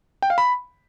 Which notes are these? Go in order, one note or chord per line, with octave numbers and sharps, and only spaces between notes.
G5
F5
B5